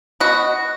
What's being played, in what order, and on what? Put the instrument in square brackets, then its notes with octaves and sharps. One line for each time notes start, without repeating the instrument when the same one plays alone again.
[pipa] B2 F#4